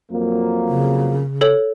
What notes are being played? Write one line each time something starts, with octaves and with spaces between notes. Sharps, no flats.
F2 F#3 A#3
C#3
A4 C#5 F#7